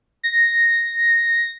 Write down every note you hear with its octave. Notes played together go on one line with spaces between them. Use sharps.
A#6